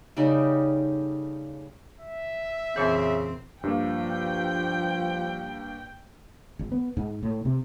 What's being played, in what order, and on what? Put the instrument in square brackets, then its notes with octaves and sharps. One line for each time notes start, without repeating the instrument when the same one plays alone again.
[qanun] C#3 G3 A3 D#4
[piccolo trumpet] E5
[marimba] F2 A#2 E3 [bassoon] C#3 [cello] C4
[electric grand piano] G2 A#3 [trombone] F3 [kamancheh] G5
[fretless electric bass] G#1
B3
G#2
A2
C3